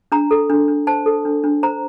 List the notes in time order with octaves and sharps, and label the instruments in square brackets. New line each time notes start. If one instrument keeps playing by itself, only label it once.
[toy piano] D4 A#5
A4
D4
D4
C5 A5
A4
D4
D4
C5 A#5